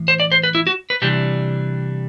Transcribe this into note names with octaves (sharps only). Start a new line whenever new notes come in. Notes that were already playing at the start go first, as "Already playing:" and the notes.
Already playing: A2 E3
C5
D5
C5
B4
E4
F#4
B4
C3 E3 G3 D4 G4